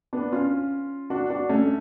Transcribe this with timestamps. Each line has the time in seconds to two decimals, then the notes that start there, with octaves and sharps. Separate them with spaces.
0.13 B3 D4
0.32 C#4 F4
1.10 D4 F#4
1.30 D4 F#4
1.49 A3 C#4